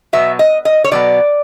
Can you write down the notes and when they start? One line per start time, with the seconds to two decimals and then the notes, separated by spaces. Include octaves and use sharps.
0.13 B2 F#3 B3 E5
0.39 D#5
0.65 D#5
0.84 C#5
0.91 B2 F#3 B3 D5